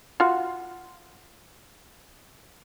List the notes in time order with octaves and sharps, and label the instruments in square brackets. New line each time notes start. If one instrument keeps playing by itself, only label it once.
[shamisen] F4 F#4